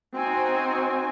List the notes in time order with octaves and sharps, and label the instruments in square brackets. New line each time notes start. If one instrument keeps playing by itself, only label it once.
[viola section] C4 D#4 F#4 C5 G#5